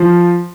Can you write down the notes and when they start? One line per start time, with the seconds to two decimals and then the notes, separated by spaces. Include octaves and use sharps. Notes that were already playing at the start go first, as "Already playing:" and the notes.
Already playing: F3